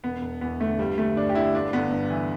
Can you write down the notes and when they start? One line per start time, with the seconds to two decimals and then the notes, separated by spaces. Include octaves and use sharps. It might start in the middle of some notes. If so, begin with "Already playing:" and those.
0.04 E1 B3
0.22 E1
0.41 E2 B3
0.60 D3 A3
0.79 G1 G3
0.97 G1 A3
1.16 G2 D4
1.29 G4
1.35 D3 E4
1.54 G1 D4
1.73 G1 B3
1.92 G2
2.10 E3